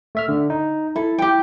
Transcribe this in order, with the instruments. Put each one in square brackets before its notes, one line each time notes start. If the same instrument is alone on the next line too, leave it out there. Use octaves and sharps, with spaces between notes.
[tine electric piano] A3 E5 F6
D3
D#4
[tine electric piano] E4 [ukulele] A4
[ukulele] G4 G5